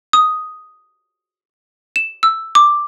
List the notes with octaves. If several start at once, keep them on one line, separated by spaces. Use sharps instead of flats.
D#6
E7
E6
D6